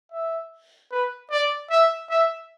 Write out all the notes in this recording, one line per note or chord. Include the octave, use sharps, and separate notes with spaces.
E5
B4
D5
E5
E5